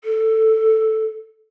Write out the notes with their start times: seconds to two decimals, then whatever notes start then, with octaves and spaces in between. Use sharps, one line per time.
0.04 A4